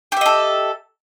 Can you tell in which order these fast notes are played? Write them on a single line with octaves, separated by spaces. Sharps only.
G4 E5 D#5 A4